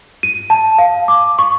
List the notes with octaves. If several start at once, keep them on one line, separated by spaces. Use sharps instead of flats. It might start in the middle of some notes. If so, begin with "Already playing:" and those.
D#7
A5
F5
D6
C#6